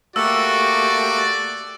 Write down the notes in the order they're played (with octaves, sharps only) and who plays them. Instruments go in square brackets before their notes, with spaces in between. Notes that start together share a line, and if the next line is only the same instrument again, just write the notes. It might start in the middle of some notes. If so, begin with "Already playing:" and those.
[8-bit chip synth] A3 A#3 G4 [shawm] F#4 [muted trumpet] D5 [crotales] E6